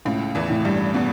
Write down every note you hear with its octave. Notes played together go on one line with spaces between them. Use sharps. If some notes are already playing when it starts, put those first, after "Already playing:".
C#2 A2 C#3
E2 E3
A2
G2 G3
B2 B3